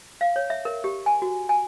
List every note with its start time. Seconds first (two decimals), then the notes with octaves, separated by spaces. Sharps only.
0.21 F5
0.36 C#5
0.50 E5
0.65 A#4
0.84 G4
1.06 G#5
1.22 F#4
1.49 G#5